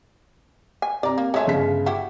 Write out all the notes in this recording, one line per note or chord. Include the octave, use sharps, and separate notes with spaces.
G#5
C3 D5 A#5
A#3
G#3 A3 C#5 E5 G#5
G1 C#3 B6
E4 F#4 G4